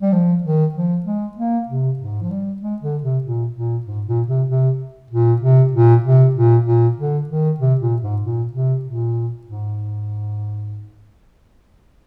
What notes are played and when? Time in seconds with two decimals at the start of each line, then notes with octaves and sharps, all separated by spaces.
0.02 G3
0.13 F3
0.44 D#3
0.75 F3
1.06 G#3
1.37 A#3
1.68 C3
1.99 G#2
2.22 F3
2.31 G3
2.62 G#3
2.82 D3
3.04 C3
3.24 A#2
3.55 A#2
3.86 G#2
4.07 A#2
4.28 C3
4.48 C3
5.11 A#2
5.42 C3
5.73 A#2
6.05 C3
6.35 A#2
6.66 A#2
6.97 D3
7.29 D#3
7.60 C3
7.81 A#2
8.02 G#2
8.22 A#2
8.53 C3
8.85 A#2
9.47 G#2